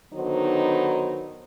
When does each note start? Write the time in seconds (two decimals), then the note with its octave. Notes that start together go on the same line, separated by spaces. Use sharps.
0.14 D3 D#3 F#3 B3 D#4 C5